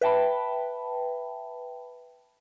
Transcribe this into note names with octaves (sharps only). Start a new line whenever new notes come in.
B4 E5 G5 A5 B5